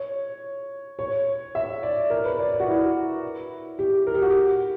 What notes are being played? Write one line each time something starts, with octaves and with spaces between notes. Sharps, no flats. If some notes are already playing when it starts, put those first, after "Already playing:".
Already playing: C#5
C#5
E5
D5
A#4
B4
D5
D5
F#4
E4
G4
A#4
G4
F#4
G4